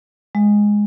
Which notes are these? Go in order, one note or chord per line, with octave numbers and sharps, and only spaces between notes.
G#3